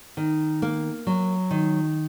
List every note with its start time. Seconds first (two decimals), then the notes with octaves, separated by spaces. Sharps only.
0.17 D#3
0.62 A#3
1.07 F#3
1.51 D#3